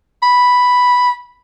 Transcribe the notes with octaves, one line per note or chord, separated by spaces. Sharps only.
B5